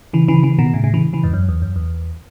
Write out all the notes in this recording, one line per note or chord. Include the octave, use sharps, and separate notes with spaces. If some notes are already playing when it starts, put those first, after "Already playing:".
C#3 E3
C#3 E3
C#3 E3
B2 D#3
A2 C#3
A2 C#3
C#3 E3
C#3 E3
E2 G#2
F#2
E2
F#2
E2